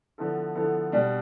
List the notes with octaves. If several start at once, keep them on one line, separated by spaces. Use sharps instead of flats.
D3 F3 B3 E4 A4
D3 F3 B3 E4 A4
B2 G3 D4